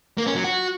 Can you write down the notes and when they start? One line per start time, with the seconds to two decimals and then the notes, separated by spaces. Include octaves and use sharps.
0.18 A#3
0.27 C#4
0.35 F#3
0.44 F#4